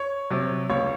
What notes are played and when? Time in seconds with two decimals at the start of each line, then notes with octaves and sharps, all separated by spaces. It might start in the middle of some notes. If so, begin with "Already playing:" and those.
Already playing: C#5
0.31 C3 F#3
0.70 C#2 C#5